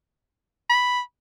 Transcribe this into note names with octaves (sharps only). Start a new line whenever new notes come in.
B5